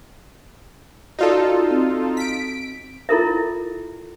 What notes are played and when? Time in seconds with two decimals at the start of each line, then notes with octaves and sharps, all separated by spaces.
1.19 D#4 F4 F#4 A4 D5 D#5
1.71 C4
2.17 B6 D7
3.09 E4 F4 A4 A#4 E5